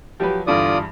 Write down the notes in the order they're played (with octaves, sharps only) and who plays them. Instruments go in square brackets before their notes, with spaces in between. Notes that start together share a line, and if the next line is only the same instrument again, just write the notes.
[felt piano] F3 F#3 B4 [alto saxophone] G4
[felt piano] E2 G2 G3 [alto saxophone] D3 [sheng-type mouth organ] F4 D5 D#6